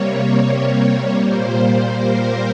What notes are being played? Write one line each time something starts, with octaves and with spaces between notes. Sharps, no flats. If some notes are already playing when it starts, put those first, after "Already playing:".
Already playing: C3 G3 A#3 C#5
A#2 G3 A#3 C5
A#4